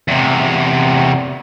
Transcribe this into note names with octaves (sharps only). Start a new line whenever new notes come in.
E2 C3